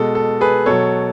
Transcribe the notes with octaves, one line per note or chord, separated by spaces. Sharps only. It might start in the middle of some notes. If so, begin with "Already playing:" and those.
Already playing: B2 G#3 A4
A4
G#4 B4
B2 F#3 A4 C#5